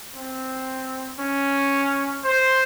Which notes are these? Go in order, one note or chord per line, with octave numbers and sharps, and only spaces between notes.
C4
C#4
C5